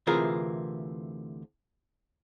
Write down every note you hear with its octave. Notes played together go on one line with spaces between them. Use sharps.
D2 C3 E3 F4 G#4 A#4